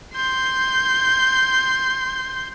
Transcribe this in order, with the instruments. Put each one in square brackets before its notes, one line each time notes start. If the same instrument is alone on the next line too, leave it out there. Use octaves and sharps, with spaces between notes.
[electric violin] C6 G6